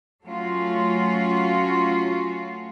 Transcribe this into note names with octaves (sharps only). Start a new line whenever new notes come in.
F#3 A3 C#4 F4 F#4